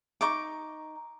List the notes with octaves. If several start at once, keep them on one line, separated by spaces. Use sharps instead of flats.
D#4 C#6 D6